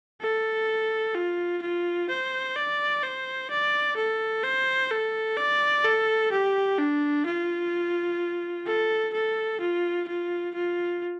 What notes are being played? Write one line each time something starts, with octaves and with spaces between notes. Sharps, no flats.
A4
F4
F4
C5
D5
C5
D5
A4
C5
A4
D5
A4
G4
D4
F4
A4
A4
F4
F4
F4